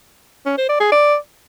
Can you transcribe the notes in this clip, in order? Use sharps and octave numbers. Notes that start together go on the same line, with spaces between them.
C#4
C5
D5
G#4
D5